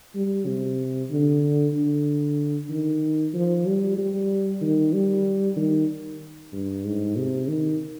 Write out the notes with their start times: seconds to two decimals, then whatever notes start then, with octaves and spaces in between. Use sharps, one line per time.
0.15 G3
0.47 C3
1.11 D3
1.74 D3
2.70 D#3
3.34 F3
3.66 G3
3.98 G3
4.61 D#3
4.93 G3
5.57 D#3
6.53 G2
6.84 G#2
7.16 C3
7.48 D#3